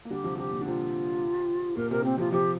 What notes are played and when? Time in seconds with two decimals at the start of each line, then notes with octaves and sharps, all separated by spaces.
0.05 A#3
0.10 D3 G3 G4
0.24 C3 F3
0.38 C3 G4
0.52 A#2
0.61 D3
0.66 C3 F4
1.77 A#2 A#4
1.91 C3 A#4
2.04 C4
2.18 C3 F3 F4
2.32 C3 F3 G4